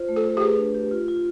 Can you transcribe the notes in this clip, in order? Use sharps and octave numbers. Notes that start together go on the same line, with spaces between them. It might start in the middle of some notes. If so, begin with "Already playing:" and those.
Already playing: F4 C5
A3
A4
A3
G4
G#4 B4
D4
G4
F4
F4